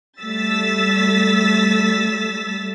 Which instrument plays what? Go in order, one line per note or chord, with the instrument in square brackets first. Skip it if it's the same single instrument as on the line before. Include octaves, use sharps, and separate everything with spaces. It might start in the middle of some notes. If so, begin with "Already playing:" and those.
[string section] G3 A3 E6 A6 B6